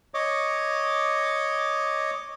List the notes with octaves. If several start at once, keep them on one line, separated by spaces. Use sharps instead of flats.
C#5 D#5 D6